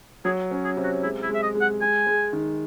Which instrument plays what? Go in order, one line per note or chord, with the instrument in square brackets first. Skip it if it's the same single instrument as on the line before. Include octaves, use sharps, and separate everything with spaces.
[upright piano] F#3 [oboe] G#4
[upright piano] C#4
[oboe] G#4
[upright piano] C3
[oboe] F#4
[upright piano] G#3 [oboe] E4
[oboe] E4
[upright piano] G#3 [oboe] E5
[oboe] D#5
[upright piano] G#3
[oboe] F#5
[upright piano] G#3 [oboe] G#5
[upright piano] G#3
D#3